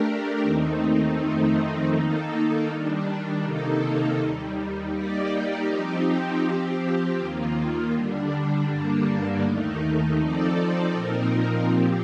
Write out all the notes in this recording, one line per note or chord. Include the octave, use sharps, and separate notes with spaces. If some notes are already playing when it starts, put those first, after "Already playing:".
Already playing: A3 D4 G4 A#4
D#2 D#3 A3 C4 D#4
F2 D#3 A3 C4 D#4
D#3 A#3 D#4 A4
D#3 G3 D4
C3 D#3 A#3 D#4 A4
D#2 D#3 G3
G3 A#3 D#4 G4 D5
F3 C4 D#4 G4
F3 C4 G4
D#2 D#3 A#3 F4
D3 G3 D4
G2 D3 G3 A#3 D4
D#2 D#3 A3 D#4
F3 C4 D#4 A4 D5
A#2 F3 C4 D#4 A#4
A#2 F3 C4 G4